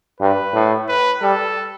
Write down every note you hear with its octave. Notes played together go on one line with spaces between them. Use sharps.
G2 B4
A2
B4
G3 A4